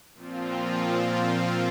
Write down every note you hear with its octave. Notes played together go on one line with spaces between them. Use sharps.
A#2 F3 C4 F4